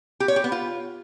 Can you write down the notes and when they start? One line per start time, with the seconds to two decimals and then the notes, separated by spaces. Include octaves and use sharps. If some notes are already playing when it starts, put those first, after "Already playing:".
0.20 G4
0.28 C#5
0.36 G4
0.44 B3
0.52 F4